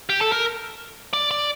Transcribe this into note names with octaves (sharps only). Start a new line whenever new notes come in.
G4
A4
A#4
D5
D5